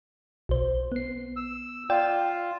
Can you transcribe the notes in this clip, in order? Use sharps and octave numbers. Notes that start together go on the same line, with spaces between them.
B1 C5
B3 C7
E6
F4 D5 G5 E7